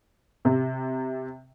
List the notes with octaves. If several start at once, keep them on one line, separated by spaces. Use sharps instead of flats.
C3